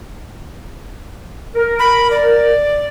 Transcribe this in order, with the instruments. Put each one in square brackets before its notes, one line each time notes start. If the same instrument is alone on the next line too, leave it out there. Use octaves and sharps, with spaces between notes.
[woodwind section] A#4
[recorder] B5
D5